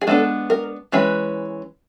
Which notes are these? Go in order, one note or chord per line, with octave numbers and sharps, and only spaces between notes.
G#4
G#3 B3 D4 A4
A#4
E3 G#3 C#4 B4